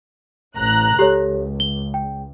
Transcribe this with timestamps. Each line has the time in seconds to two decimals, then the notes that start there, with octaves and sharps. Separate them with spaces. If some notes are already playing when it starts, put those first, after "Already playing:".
0.56 A1 A#5 F#6
0.99 C#2 G4 A4 C#5
1.60 G7
1.94 G5